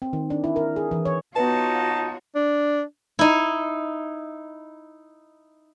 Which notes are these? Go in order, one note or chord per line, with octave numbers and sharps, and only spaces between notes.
C4
D#3
D4
E4
A#4
G#4
E3
C#5
B3 D#4 F4 F#4 B4 C#5 A5
D4
D#4 E4